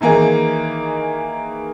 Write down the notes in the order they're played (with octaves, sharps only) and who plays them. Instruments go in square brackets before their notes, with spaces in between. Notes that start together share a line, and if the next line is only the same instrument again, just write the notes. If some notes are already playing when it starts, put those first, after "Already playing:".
[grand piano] D#3 E3 A#3 D#4 G#4